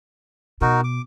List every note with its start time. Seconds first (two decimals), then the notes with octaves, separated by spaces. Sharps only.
0.61 B2 D#4 F#4 A#4
0.84 D6